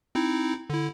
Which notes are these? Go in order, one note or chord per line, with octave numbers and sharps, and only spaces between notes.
C4 D#4 E4
D3 E4